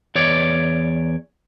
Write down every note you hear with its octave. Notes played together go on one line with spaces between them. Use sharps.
E2 C#5 D5